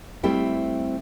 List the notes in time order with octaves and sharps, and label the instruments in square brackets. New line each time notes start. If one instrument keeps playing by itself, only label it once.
[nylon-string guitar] G3 A3 C4 E4 G4